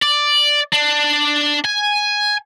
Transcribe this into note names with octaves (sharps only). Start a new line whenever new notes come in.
D5
D4
G#5